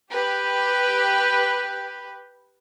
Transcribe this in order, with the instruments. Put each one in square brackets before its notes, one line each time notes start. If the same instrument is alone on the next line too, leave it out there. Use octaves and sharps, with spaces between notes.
[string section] G4 B4